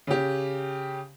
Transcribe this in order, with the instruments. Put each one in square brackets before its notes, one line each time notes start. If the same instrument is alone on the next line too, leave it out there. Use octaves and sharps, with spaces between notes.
[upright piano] C#3 G4